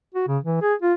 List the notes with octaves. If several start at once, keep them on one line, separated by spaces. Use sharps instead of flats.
F#4
C#3
E3
G#4
F4